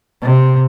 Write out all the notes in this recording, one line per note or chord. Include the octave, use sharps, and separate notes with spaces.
C3